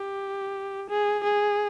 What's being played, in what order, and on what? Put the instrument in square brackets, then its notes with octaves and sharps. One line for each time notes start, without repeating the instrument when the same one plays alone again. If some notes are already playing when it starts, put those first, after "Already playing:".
Already playing: [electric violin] G4
G#4
G#4